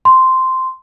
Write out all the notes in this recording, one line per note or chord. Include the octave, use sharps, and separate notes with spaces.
C6